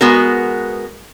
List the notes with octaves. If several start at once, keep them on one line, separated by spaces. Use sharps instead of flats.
G#3 B3 F#4 A#4